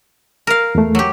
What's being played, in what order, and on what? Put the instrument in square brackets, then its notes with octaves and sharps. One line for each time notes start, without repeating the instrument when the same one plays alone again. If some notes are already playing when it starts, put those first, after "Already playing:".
[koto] A#4 F5
[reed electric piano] E2 A3
[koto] F#3 G4